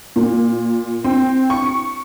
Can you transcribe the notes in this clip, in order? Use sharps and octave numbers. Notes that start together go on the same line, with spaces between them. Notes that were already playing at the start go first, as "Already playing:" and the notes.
A#2
C4
C#6